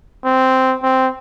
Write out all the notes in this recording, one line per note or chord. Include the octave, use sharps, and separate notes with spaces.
C4
C4